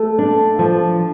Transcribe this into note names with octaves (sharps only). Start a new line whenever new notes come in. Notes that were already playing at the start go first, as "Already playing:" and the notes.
Already playing: A3
D4
F3